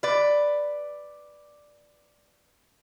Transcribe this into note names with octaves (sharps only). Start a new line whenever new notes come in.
B4 D5